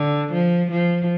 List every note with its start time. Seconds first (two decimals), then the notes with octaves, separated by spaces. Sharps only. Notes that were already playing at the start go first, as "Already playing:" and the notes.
Already playing: D3
0.32 F3
0.71 F3